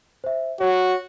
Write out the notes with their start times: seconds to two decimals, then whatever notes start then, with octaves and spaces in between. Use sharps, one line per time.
0.24 C5 E5
0.61 F#4 C#5